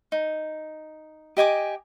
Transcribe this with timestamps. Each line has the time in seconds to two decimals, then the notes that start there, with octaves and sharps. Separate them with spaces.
0.12 D#4
1.37 G4 D#5 G#5 D6